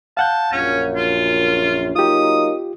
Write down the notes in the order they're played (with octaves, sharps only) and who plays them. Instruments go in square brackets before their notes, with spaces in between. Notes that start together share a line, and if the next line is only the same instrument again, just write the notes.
[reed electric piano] F5 F#5 G6 [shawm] A5
[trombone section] A#1 F#2 [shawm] C#4
[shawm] F4
[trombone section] F#3 A#3 D#4 [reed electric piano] F4 G4 [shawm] D#6